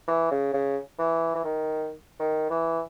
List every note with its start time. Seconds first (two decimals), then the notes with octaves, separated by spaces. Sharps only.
0.08 E3
0.31 C#3
0.54 C#3
0.98 E3
1.35 E3
1.44 D#3
2.19 D#3
2.50 E3